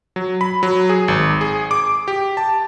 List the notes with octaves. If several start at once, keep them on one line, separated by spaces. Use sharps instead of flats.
F#3
B5
F#3
G#4
G#1
G#4
D6
G4
A5